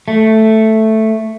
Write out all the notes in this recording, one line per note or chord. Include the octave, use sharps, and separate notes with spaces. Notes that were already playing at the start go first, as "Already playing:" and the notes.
A3